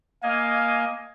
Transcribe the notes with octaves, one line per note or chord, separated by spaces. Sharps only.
A#3 D#5 F5 G#5